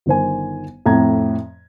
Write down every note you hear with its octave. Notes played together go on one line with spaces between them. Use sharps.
G1 D#3 C5 G#5
F2 A2 A#5 G#6